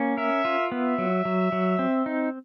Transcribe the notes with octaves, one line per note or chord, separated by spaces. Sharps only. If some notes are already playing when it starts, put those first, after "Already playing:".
Already playing: A#3 C#4
A#4 E5
F4
B3 E5
F#3
F#3
F#3
C4
D#4